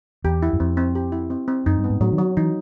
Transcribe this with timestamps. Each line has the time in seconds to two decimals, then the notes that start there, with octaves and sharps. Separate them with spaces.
0.24 E2 G4
0.42 E4
0.53 F#2
0.60 F2 C4
0.77 C4
0.95 G4
1.12 E4
1.30 C4
1.48 C4
1.66 F#2 D#4
1.78 G2
1.84 B3
1.90 G#2
2.00 A2 F#3
2.12 D#3
2.18 F#3
2.37 E3 D#4